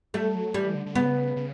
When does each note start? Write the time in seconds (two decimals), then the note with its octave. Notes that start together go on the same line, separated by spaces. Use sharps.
0.14 G3 A3
0.35 F#3
0.54 E3 G3
0.75 D3
0.86 D3
0.95 C#3 B3
1.36 C#3